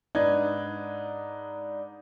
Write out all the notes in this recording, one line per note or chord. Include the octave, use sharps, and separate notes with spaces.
G#2 D4 D#4 B4 G#6